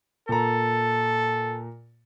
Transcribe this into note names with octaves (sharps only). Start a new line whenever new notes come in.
A#2 A4 A#5